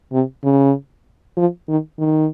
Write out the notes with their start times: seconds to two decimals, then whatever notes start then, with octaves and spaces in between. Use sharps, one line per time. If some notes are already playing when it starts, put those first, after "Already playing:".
0.12 C3
0.44 C#3
1.37 F3
1.68 D#3
1.99 D#3